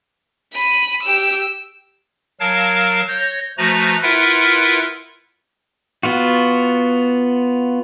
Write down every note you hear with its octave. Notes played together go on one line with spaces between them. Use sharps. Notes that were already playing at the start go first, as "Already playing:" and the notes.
B5 D#7
G4 E6
F#3 A#4 F5 A5 G#6
C#5 G6 A#6
F3 A3 F#4 B4 A#5 A#6
E4 F4 A#4 B4 E5 F#5
B3 F4 F#4